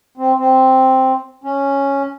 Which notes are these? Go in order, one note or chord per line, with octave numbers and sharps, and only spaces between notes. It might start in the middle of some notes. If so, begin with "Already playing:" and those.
C4
C4
C#4